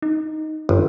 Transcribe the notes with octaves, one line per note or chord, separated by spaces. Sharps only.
D#4
G1 F#2